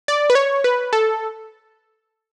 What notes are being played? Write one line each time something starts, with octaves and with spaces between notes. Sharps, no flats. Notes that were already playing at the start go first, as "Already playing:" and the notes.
D5
B4
C#5
B4
A4